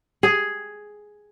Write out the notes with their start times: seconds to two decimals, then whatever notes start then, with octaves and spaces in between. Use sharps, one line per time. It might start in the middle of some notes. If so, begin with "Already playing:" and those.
0.23 G#4